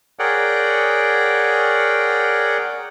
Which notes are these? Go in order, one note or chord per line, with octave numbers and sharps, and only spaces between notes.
G#4 A#4 C#5 D5 F#5 G5